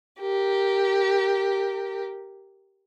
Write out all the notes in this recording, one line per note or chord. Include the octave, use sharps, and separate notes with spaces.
G4 A#4